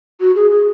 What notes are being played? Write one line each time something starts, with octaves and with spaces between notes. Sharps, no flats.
F#4
G#4
G#4